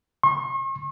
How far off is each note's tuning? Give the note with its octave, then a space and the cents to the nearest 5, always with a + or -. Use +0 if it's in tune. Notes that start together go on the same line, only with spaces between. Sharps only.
C#6 -45